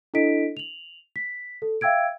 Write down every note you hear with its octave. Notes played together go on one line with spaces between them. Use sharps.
D4 E4 A4 D#5 B6 D7
F7 F#7
B6
A4
E5 F5 G5 E6 G#6 D7